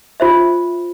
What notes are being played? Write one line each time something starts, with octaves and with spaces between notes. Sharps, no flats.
F4 C5 E5